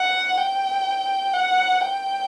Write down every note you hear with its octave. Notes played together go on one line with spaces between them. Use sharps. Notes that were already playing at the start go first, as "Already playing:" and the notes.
Already playing: F#5
G5
F#5
G5